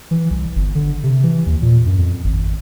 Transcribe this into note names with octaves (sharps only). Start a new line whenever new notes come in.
E3
C2
G1
D3
C3
E3
D#2
A#2
F#2
F2
G#1